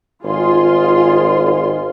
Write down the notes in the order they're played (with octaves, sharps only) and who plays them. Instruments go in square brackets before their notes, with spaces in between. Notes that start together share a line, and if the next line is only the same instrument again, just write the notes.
[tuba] G#1 [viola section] F4 G#4 C6